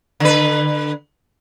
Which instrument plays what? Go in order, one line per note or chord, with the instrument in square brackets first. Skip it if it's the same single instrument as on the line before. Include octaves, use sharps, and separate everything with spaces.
[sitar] D3 B4